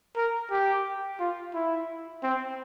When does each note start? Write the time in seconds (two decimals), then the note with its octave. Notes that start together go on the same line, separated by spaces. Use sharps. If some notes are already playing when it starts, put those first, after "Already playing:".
0.16 A#4
0.51 G4
1.20 F4
1.54 E4
2.23 C4